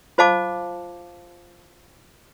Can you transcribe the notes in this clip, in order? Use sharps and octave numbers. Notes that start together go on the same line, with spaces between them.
F4 C5 D#5 F5 A5 D6